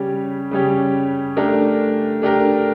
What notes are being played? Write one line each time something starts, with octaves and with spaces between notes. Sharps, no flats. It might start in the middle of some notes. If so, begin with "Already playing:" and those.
Already playing: C#3 G3 C#4 G4
C#3 G3 C#4 G4
A3 D4 G4 A#4
A3 D4 G4 A#4